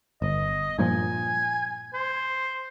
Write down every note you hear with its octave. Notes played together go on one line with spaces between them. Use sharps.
G1 D#5
G2 A#2 F3 G#5
C5